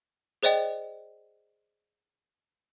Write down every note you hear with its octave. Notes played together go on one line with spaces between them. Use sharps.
G#4 C5 D5 D#5 G5